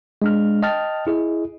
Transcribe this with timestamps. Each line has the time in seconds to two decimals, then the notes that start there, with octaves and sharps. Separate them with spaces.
0.22 G#3 D4 F6
0.63 D#5 G5 A5 F6 A6
1.07 E4 G#4 D#5